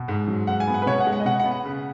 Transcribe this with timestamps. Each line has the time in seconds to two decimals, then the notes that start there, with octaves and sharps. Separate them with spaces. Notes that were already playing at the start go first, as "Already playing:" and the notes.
Already playing: B2
0.08 G#2
0.28 F#3
0.47 G#2 F#5
0.60 G#5
0.67 B3
0.74 F#5
0.82 B4
0.86 B2 C#5
1.00 F#5
1.07 G#3
1.12 F#5
1.20 D#5
1.25 B2 F#5
1.39 F#5
1.46 B3
1.52 F#5
1.65 C#3